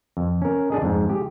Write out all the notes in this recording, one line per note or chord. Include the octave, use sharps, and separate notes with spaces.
F2
C#4 A#4
D4 G#4 D#5
F2 G#2
G4 G#4